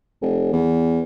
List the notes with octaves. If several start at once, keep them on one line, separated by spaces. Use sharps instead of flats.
F1
E2